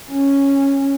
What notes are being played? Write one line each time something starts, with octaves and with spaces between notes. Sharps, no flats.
C#4